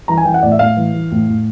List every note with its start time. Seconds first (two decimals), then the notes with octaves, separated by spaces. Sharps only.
0.08 E3 A#5
0.18 G#5
0.25 E3 G5
0.34 F#5
0.43 A2 D5
0.52 E5
0.59 A2 F5
0.77 E3
0.94 E3
1.11 A2
1.29 A2